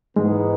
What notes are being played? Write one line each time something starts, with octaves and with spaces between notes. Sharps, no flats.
G#2 E3 G#3 B3 D#4